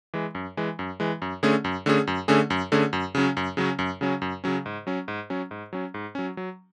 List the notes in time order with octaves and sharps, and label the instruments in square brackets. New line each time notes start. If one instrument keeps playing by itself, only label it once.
[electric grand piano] E3 G#3
F#2
E3 G#3
F#2
E3 G#3
F#2
D3 A3 C#4 G#4
F#2
D3 A3 C#4 G#4
F#2
D3 A3 C#4 G#4
F#2
D3 A3 C#4 G#4
F#2
C#3 F#3 C#4
F#2
C#3 F#3 C#4
F#2
C#3 F#3 C#4
F#2
C#3 F#3 C#4
G#2
F#3 C#4
G#2
F#3 C#4
G#2
F#3 C#4
G#2
F#3 C#4
F#3